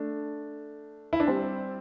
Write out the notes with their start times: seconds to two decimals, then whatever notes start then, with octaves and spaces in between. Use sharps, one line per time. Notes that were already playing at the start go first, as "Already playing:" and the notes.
Already playing: A3 D4
1.13 E4
1.20 D4
1.27 G3 C4